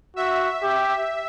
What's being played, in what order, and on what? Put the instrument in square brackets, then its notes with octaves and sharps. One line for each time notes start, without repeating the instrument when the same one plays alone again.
[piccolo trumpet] F#4 [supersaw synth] E5
[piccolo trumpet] G4